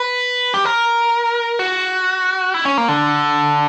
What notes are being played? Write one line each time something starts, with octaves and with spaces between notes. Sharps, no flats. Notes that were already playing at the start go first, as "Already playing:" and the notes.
Already playing: B4
G4
A#4
F#4
E4
C#4
A#3
D3